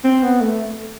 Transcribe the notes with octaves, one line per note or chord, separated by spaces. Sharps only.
C4
B3
A3